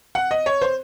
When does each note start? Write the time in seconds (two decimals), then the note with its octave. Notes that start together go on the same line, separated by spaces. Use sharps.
0.15 F#5
0.31 D#5
0.46 C#5
0.61 C5